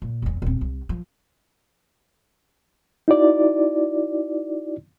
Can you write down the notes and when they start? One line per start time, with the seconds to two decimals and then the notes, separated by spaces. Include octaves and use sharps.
0.02 A#2
0.22 E1 E2
0.42 D#1 C4
0.61 C2
0.89 F3
3.08 D#4 E4 F#4 D5